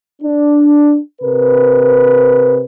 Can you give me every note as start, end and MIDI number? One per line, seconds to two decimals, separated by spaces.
0.22 0.99 62
1.21 2.64 48
1.21 2.64 70
1.21 2.64 71